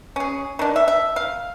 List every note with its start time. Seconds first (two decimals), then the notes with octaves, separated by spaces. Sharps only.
0.16 C#4 G#4
0.59 D#3 D4
0.76 E5
0.88 E5
1.16 F5